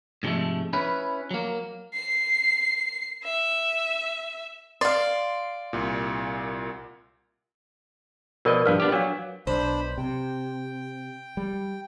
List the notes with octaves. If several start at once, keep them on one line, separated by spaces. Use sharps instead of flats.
G#2 C3 F3 F#3 G#3 A3
C#4 E4 B4
F#3 A#3
C7
E5
D5 F5 C6 A6
C2 A#2
B2 F3 F4 A#4 D5 D#5
A#1 G2 F3 B4 F5
B3 D4 G4
F#3 D4 F5
B1 D4 C5 B5
C3 G5
G3